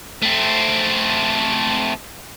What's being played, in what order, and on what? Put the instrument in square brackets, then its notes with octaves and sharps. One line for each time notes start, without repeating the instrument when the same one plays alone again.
[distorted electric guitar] A3 C4